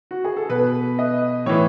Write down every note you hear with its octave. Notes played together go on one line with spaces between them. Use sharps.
F#4
G#4
A4
B2 B4
D#5
A2 E3 C#5